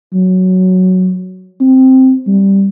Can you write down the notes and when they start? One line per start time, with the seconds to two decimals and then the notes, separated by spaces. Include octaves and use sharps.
0.14 F#3
1.61 C4
2.28 G3